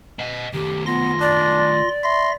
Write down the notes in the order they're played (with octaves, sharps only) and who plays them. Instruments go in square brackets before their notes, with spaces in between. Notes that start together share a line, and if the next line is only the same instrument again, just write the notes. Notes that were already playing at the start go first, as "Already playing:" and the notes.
[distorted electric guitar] D#5 F#5
[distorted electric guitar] D#3 A3 [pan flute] G4
[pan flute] B3 [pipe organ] F4 C6 A#6
[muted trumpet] D4 [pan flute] D5
[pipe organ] E5 A#6 [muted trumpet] C6